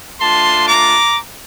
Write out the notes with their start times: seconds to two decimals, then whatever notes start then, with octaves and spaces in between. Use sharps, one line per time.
0.20 A3 D4 F4 A5 C6
0.68 A#5 D6